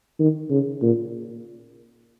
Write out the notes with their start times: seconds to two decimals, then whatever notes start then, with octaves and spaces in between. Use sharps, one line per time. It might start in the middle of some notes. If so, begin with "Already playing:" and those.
0.20 D#3
0.50 C#3
0.82 A#2